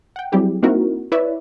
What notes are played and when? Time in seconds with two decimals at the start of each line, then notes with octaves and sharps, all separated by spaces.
0.16 F#5 G5
0.32 F#3 G3 C4 E4 G4 G#4
0.63 A#3 C4 D#4 E4 F#4 A#4
1.12 E4 B4 C#5 D5 E5